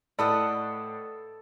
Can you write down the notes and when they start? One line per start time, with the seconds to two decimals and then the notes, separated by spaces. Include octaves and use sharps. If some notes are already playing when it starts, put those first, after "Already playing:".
0.19 A2 A4 B4 D5 D#5 F#5